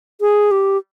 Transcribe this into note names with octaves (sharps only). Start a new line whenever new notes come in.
G#4
G4